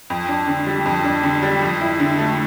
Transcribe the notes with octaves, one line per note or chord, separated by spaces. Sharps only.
F2
D4
D3
G3
F2
D4
D3
G3
F2
E4
D3
A3